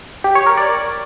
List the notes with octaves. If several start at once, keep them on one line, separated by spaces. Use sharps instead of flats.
G4
C#5
A#4
D5